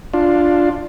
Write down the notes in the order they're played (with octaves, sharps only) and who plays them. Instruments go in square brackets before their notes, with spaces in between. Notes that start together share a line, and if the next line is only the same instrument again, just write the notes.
[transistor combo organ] D4 F4